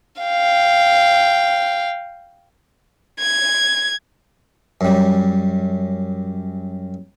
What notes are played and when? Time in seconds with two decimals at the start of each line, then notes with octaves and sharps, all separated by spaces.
0.22 F5 G5
3.20 G#6
4.81 F#2 G3